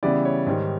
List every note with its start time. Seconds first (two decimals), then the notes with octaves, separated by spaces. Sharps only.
0.03 C#3 E3 G3 B3 E4 D5
0.25 C#5
0.47 G#2 D#3 G3